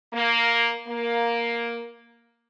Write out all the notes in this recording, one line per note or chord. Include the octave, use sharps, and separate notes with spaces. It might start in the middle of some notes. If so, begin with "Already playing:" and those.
A#3
A#3